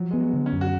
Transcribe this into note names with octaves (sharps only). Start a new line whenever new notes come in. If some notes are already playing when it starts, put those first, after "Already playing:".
Already playing: F3 F#3
G#3 B3
F#3
D3
C#4
F#2
F#4